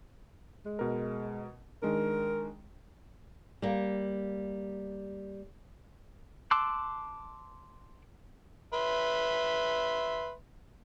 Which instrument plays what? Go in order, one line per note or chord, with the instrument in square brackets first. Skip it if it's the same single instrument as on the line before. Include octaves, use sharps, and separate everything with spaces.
[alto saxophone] G#3
[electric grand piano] B2 A#4
[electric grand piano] D#3 G#3 D4 [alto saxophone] A#4
[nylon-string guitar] G3 A#3
[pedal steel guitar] A5 C6 D6 E6 F#6
[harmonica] B4 E5 C6